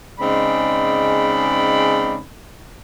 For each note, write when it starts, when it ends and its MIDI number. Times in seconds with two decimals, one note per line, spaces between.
0.20 2.19 49
0.20 2.19 56
0.20 2.19 60
0.20 2.19 63
0.20 2.19 74
0.20 2.19 83